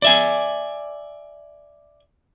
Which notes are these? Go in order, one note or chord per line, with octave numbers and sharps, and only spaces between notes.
D5 E5 G#5